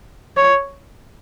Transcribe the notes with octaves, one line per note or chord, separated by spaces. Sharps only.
C#5